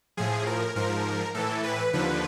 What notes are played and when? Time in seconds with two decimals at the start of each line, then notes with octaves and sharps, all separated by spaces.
0.17 A2 F3 G#4
0.47 A#4
0.75 G#2 F3 A#4
1.34 A2 E3 A4
1.63 B4
1.93 D#2 D3 F3 B4